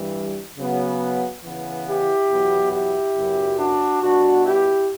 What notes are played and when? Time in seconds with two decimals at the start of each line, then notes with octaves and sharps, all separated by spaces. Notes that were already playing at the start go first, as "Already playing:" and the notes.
Already playing: G2 E3 G3
0.58 C#3 F#3 B3
1.44 C#3 E3 B3
1.87 E4 G4
2.30 E2 B2 F#3 B3
2.73 E4 G4
3.16 F#2 C#3 F#3 B3
3.59 D4 F#4
4.02 B2 G3 B3 D4 F#4
4.45 E4 G4